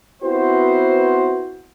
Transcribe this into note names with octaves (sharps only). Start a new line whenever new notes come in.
B3 C4 E4 F#4 B4 C5